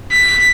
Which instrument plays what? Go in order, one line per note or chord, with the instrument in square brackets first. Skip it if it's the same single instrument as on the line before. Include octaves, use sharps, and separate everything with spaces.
[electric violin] B6